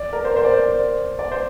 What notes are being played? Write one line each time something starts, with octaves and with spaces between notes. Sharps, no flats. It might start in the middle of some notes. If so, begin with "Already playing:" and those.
Already playing: D5
A#4
C5
C5
D5
C5
D5
C5